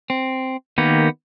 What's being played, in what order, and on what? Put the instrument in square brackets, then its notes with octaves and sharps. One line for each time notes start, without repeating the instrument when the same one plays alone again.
[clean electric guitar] C4
[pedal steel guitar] D#3 A#3 G4 [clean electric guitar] B3